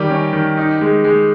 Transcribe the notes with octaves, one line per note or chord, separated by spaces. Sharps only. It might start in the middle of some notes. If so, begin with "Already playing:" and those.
Already playing: D#3 G3 G4
C#4
D#3
D#4
G#3
G#3